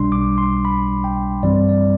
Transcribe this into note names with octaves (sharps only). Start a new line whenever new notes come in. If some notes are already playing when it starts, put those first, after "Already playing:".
Already playing: B1 B2 G3 D4 C6
D6
C6
B5
G5
G2 E3 G3 C4 D5
D5